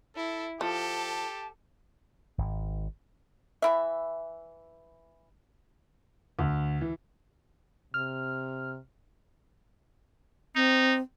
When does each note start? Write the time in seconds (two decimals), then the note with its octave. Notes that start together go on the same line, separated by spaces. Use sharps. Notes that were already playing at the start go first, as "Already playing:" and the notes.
0.16 E4 A4
0.61 F3 G4 A4 A5
2.38 G#1
3.62 E3 E4 E5
6.39 D2
6.81 E3
7.94 C3 F6
10.55 C4 D#4